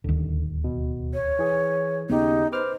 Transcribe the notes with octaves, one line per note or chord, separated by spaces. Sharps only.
D1 D#2 D3
B2
C#5
E3 G#4
D#2 C#3 B3 D#4 G4
B4 C5 D6 F6